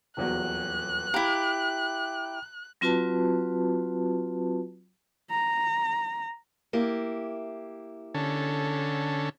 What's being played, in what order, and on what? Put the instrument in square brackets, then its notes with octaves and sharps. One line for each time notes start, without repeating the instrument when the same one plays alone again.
[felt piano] D#1 E2 F#3 [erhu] F#6
[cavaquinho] E4 G4 [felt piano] F5 A#5 B5
[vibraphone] F#3 C4 F4 F#4 B4 A5
[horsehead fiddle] A#5
[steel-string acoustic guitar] A#3 E4 G4
[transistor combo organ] D3 C#4 A4